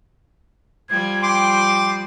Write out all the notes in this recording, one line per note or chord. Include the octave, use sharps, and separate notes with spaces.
F3 G3 G#6
G5 C6 D6